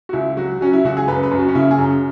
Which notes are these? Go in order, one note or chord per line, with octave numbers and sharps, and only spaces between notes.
F#4
C#2 E4
F#3 F#4
F#3 C#4
E4
C#2 F#4
G#4
F#2 B4
B4
F#2
F#4
C#4
C#3 E4
G#4
F#2